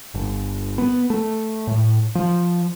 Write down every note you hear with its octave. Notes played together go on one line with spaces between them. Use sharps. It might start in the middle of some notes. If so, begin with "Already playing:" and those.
G1
B3
A3
A2
F3